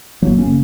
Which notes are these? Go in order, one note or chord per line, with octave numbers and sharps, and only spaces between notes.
F#1 F#3 A#3
A#3 C#4
C#3